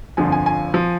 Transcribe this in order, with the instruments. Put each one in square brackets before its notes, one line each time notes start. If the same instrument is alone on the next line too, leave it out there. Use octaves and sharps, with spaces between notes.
[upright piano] G1 F2 D3 F3 G#5
G#5
G#5
F3